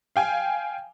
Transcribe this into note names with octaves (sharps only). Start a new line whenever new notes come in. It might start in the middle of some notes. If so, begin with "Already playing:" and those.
F5 G5 G#5